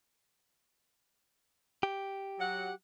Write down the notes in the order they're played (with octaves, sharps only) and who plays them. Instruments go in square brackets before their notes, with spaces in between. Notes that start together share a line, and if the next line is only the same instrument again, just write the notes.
[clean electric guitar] G4
[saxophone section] F#3 F#5